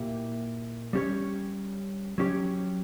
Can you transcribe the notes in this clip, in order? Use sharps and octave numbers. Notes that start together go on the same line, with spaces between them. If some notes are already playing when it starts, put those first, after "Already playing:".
Already playing: A#2 A#3 E4 G4
G3 C#4 G4 C#5
F#3 C#4 G4 C#5